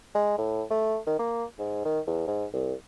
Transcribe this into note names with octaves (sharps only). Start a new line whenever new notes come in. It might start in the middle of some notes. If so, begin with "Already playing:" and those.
G#3
A2
A3
D#3
A#3
G#2
D#3
E2
G#2
C2